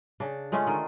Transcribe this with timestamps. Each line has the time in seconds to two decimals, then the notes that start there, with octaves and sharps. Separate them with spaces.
0.20 C#3 D4
0.52 G#3 A3 C#4 F4
0.67 D3 D#3